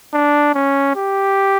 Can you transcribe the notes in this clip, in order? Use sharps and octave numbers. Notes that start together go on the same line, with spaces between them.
D4
C#4
G4